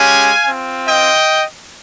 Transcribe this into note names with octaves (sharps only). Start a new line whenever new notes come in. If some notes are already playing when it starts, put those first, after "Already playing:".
Already playing: G#3 C#4 G4 F5 G#5
C4 F4
D#5 G5